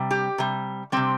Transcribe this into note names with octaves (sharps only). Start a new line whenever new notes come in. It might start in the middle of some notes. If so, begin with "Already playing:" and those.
Already playing: C3 G3
G4
C3 G3
C3 G3 C4